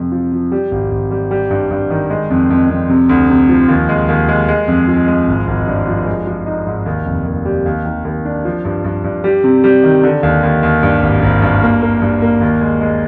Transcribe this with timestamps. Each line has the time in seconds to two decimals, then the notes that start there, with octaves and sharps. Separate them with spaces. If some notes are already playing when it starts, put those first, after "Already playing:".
Already playing: F2 C3
0.12 F3
0.32 F3
0.52 G3
0.71 G#1
0.91 G#1
1.11 G3
1.31 G3
1.50 G2
1.70 G2
1.90 D#3
2.10 G#3
2.30 F2
2.50 F2
2.70 F2
2.89 C3
3.09 D2
3.29 C3
3.49 F3
3.69 D#2
3.89 G#3
4.08 D#2
4.28 G#3
4.48 G#3
4.68 F2
4.88 F3
5.07 G#3
5.27 G#1
5.47 G#1
5.67 G2
5.87 F3
6.07 G#3
6.27 F3
6.46 D#4
6.66 G#2
6.86 D#2
7.05 F1
7.26 D#2
7.45 G3
7.66 D#2
7.85 D#3
8.05 D#2
8.25 D4
8.45 F3
8.65 G2
8.84 G2
9.04 G2
9.24 G3
9.44 C3
9.64 G3
9.84 D#3
10.03 D3
10.23 D#2
10.43 D#2
10.63 D#2
10.83 G2
11.02 G#1
11.22 G#1
11.42 G2
11.63 A#3
11.82 A#3
12.02 G2
12.22 A#3
12.41 D#2
12.61 G#3
12.81 G#3